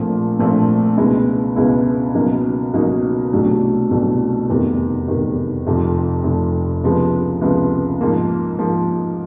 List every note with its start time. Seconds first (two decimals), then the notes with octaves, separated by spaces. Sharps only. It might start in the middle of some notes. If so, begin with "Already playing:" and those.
Already playing: A#1 A#2 F3 A3 C4
0.39 A#1 A#2 F3 A3 C4
0.97 C#2 B2 G#3 B3 E4
1.56 C#2 B2 G#3 B3 E4
2.15 C#2 B2 F#3 A#3 D#4
2.74 C#2 B2 F#3 A#3 D#4
3.32 C2 B2 F#3 A3 D4
3.91 C2 B2 F#3 A3 D4
4.49 F1 E2 C3 D#3 G3
5.07 F1 E2 C3 D#3 G3
5.67 F1 F2 C3 F3
6.24 F1 F2 C3 F3
6.83 C#2 C3 F3 G#3 B3
7.41 C#2 C3 F3 G#3 B3
8.01 G#2 F3 A#3
8.59 G#2 F3 A#3